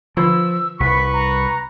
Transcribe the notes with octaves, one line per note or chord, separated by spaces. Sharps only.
D3 F3 F4 E6
C2 B4 C#6 B6
A#5